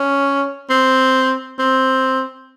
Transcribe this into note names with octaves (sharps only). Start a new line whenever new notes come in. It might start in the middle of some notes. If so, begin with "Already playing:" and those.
Already playing: C#4
C4
C4